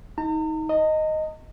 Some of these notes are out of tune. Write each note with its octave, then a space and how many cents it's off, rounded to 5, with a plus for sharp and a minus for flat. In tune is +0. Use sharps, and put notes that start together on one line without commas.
D#4 +25 A#5 -45
D#5 +0 A#5 -45